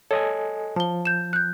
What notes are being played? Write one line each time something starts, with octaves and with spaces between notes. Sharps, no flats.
A4 C#5 D#5 G#5
F3 A5 G7
G6 E7
F#6 G6